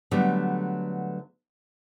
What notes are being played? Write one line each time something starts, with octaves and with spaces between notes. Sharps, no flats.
D3 F#3 G3 A3 B3